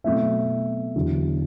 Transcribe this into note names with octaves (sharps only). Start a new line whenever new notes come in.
B2 F#3 A3 C4 E5
E2 D3 F#3